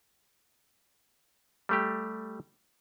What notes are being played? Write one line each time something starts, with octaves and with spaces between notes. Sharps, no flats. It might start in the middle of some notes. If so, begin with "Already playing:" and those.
G3 A3 G4